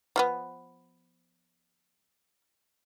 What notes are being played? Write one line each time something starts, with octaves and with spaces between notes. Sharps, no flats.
F3 A3 B3